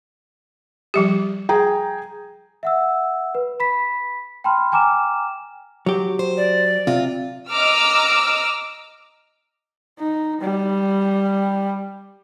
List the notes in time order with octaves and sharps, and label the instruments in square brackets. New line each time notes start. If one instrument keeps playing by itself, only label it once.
[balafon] F3 G3 G4
[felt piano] G#4 G5 A#5
[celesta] E5 F#5 E6
B4
B5 B6
G5 A5 B5 C6 F6
G5 G#5 A#5 D6 F6 E7
[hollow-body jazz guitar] F#3 G4
[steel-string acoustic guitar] C5
[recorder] D5
[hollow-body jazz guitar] C3 [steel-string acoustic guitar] F4
[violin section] D#5 A#5 D6 E6 F6
[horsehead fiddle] D#4
G3